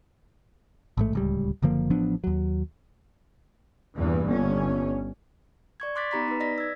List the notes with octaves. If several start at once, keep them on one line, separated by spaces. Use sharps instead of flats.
A1 G#2 A3
D1 C#2 G3
F#1 D3 F3 A#3
A1 F3 B3 D4
D#2 F#3
E2 G2 A#2 E3
G1 C#4
D5 C#6 G#6
C6 D6 F#6 A6 B6
B3 D#4 G4 A#5 B5 B6
D#4 B4
D5 D#5 A#6 B6
E6 G#6